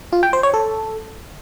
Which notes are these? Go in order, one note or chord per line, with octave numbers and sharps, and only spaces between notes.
F4
G5
C5
C#5
A4